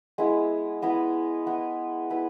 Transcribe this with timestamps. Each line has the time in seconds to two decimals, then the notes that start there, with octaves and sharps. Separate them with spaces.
0.18 G#3 B3 E4
0.82 B3 E4 B4 D#5
1.46 B3 E4 B4 D#5
2.10 B3 E4 B4